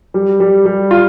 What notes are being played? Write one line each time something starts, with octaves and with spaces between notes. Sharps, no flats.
G3
G3
G3
F4